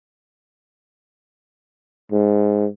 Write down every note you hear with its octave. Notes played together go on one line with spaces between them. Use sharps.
G#2